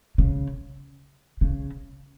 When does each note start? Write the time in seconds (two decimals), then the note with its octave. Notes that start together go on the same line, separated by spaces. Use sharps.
0.18 C#3
1.41 C#3